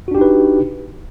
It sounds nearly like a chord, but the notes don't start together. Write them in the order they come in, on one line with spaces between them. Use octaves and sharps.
F#4 D4 G4 D#4 B4